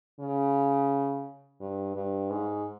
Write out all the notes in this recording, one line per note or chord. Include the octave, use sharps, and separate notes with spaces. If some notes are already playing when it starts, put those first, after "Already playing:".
C#3
G2
G2
G#2